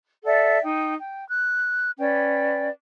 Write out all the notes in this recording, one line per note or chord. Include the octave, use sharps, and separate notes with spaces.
A4 D5 E5 F#5
D#4 G5
G5
F#6
C#4 B4 D5 G5